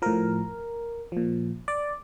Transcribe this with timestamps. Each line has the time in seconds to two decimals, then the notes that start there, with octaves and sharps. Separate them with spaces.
0.02 A2 F3 A#4
1.12 A#2 F3
1.68 D5